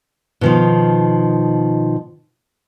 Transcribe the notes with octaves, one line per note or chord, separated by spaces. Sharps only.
B2 D#3 F3